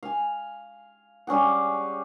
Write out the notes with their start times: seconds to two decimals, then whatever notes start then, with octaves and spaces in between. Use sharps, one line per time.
0.03 F5 G#5
1.27 G3 C#4 G#4 F#5